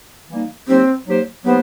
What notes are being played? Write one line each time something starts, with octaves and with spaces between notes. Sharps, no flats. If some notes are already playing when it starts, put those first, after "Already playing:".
E3 G3 A#3 D#4
F#3 A#3 C4 D#4 G4 C5
F#3 A#3 D#4 G4 C5
F#3 A#3 B3 D#4 G4 C5